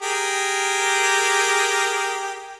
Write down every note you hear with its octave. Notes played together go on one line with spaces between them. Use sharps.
G4 G#4 A#4